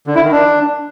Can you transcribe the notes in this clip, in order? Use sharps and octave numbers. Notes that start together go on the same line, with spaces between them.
D3
E4
D#3
D4